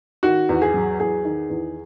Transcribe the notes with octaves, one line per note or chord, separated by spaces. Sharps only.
D#3 F#4
E2
G#4
F#3
E2 G#4
D#3
E2